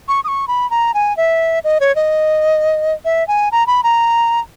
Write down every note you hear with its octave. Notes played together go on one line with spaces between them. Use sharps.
C#6
D#6
C#6
B5
A#5
G#5
E5
D#5
C#5
D#5
E5
G#5
A#5
B5
A#5